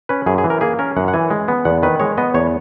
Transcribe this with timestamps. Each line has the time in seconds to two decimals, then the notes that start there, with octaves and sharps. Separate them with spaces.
0.09 C#4 B4
0.26 F#2 G#4
0.38 G#4
0.44 E3
0.50 A#4
0.61 A#3 G#4
0.79 C#4 A#4
0.96 F#2 F#5
1.08 F#5
1.13 E3 G#5
1.30 G#3
1.48 B3
1.65 E2 F#5
1.83 D#3 B4
2.00 G#3 C#5
2.18 B3 D#5
2.34 E2 C#5